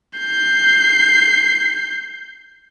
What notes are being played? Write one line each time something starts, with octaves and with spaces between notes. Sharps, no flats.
G6 C7